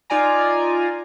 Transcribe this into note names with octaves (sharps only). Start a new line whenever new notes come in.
D#4 F4 D5 G#5 A#5